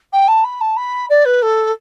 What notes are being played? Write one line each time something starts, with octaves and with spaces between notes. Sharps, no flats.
G5
A5
B5
A5
B5
D5
B4
A4